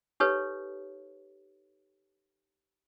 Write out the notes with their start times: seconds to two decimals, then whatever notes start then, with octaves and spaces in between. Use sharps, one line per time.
0.20 D#4 G4 A4 B4 C#5